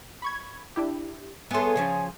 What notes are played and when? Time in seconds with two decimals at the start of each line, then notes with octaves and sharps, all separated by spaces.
0.22 B5 C#6 G#6
0.76 D4 E4 G4
1.51 B3 G#4 A4 C#5 E5 G#5 C6
1.76 C#3 F3 C#4